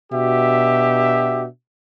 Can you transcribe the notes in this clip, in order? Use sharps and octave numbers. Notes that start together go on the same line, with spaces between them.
B2 D4 F#4 G4 E5